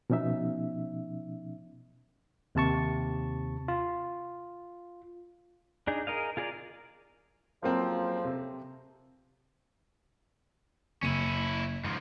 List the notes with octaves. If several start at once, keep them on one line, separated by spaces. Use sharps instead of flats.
B2 F3 C#4 D#4 E5
D#2 C3 A5 C#6
F4
D4 D#4 G#4
G#4 A#4 D#5 F5
F4 G#4 A#4 D5 F5
F2 C#3 F3 F#3 A#3 C4
C3
F#1 C#4 E4 D#7
G#2 F3